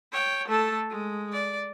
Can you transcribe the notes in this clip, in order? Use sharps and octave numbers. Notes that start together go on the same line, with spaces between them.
C#5 G5
A3 A4
G#3
D5